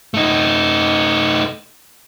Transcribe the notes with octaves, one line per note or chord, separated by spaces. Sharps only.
A3 D#4